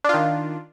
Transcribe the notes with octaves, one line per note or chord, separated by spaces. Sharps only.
D#3 D4 F4